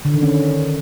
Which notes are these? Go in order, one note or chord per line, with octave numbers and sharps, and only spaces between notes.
D3
D#3
C#4